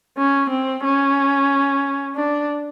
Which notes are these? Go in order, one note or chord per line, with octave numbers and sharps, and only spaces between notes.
C#4
C4
C#4
D4